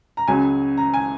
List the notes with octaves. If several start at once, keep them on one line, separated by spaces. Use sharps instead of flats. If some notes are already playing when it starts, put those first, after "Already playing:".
A#5
C#2 C#3 F#3 G#5
A#5
G#5